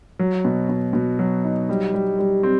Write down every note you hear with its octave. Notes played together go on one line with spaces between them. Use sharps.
F#3
B2
B2
B2
F#3
D#4
G3
G3
G3
C4